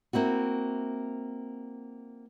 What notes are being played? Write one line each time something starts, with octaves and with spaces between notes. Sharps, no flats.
A#3 C4 E4 F#4